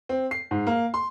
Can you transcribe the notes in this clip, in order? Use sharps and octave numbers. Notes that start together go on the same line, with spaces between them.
C4
C7
G#2
A#3
C6